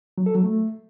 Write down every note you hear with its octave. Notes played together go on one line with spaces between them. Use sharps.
F#3
A4
F#3
A3